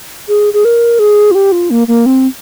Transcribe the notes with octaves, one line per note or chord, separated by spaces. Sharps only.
G#4
G#4
A#4
G#4
F4
G4
F4
A#3
A#3
C4